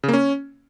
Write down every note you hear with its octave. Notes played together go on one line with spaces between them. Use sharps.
C#3
A#3
C#4